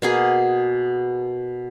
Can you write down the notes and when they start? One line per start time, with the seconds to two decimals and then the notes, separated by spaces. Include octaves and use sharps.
0.02 B2 A#3 G#4